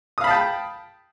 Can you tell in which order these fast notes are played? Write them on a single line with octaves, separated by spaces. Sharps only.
D#6 F5 B5 A5 G5